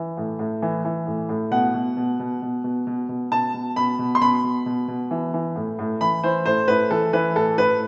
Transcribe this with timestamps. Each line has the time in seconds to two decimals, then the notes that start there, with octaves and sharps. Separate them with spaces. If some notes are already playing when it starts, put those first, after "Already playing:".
Already playing: E3
0.17 A2
0.39 A2
0.62 E3
0.85 E3
1.06 A2
1.29 A2
1.51 B2 F#5
1.74 B2
1.97 B2
2.20 B2
2.42 B2
2.64 B2
2.87 B2
3.09 B2
3.31 B2 A5
3.54 B2
3.76 B2 B5
3.99 B2
4.15 C6
4.21 B2 B5
4.44 B2
4.66 B2
4.88 B2
5.11 E3
5.34 E3
5.56 A2
5.79 A2
6.01 E3 B5
6.23 E3 C5
6.45 A2 C5
6.68 A2 B4
6.91 E3 A4
7.13 E3 B4
7.36 A2 A4
7.58 A2 B4